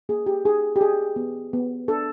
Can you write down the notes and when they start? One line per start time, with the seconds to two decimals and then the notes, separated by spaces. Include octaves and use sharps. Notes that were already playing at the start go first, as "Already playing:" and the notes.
0.09 A#3 G#4
0.26 G4
0.44 D#4 G#4
0.76 G4
0.81 F#4 G#4
1.16 B3
1.53 B3
1.88 D4 A4